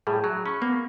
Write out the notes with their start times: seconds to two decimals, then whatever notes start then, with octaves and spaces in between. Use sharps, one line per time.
0.07 A2 G3 G#4
0.24 F#3
0.46 C#4 B5 C#6
0.62 A#3 B3